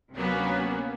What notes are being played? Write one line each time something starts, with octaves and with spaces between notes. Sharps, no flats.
D2 C3 F#3 A#3 B3 C#4